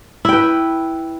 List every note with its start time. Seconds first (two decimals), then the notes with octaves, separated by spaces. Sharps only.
0.25 E4
0.29 G5
0.32 B4